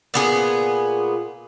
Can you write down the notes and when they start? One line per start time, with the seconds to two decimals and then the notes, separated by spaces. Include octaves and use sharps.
0.14 A#2 B3 G#4